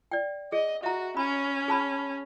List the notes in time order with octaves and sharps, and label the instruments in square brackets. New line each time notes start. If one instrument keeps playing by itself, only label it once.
[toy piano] D5 G5
[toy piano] G#4 [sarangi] D#5
[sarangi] F#4 [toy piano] E5 A#5
[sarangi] C#4 [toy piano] B5
[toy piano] G#4 A5 B5